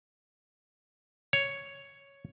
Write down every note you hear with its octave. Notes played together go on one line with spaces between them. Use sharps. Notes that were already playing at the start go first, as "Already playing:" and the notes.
C#5